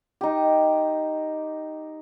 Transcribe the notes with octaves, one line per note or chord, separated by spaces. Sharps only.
D#4 G4